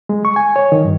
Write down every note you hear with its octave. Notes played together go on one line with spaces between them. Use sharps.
G#3
C#6
G#5
C#5
D#3
G2